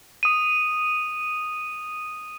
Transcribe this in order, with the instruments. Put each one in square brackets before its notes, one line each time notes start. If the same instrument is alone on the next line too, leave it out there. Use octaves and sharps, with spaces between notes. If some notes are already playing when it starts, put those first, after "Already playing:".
[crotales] D#6 D#7